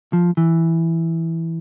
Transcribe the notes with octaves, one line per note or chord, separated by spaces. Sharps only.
F3
E3